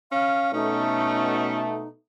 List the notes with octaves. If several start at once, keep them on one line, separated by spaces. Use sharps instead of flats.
C#4 F5
B2 A3 C#4 D#4